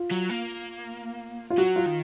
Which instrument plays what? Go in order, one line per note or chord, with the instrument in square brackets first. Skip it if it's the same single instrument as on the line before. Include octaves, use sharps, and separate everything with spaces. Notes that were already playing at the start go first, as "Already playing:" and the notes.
Already playing: [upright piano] F4
[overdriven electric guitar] F#3
A#3
[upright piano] F4
[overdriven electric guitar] F#3 [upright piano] F#4
[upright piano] F4
[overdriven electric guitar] D#3